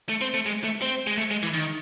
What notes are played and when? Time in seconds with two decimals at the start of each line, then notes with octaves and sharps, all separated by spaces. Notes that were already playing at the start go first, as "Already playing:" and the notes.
0.09 A3
0.21 C4
0.34 A3
0.46 G#3
0.64 A3
0.82 C4
1.07 G#3
1.18 A3
1.31 G#3
1.43 E3
1.54 D#3